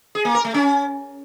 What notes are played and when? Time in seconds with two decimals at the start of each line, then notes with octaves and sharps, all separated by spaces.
0.15 G#4
0.25 A#3
0.35 A#4
0.45 A3
0.54 C#4